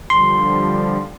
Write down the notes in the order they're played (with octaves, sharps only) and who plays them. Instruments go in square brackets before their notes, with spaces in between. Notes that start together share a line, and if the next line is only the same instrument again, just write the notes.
[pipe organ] D3 F3 G3 [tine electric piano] C6